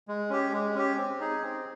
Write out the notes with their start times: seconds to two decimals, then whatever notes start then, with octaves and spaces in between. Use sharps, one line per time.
0.08 G#3
0.30 C#4 G4
0.53 G#3
0.75 C#4 G4
0.97 C4
1.20 D#4 G#4
1.43 C4